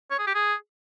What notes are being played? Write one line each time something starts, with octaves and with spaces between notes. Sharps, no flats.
C#5
G#4
G4
G#4